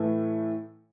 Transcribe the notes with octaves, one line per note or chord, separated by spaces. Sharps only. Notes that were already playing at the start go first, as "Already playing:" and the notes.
Already playing: A2 E3 A3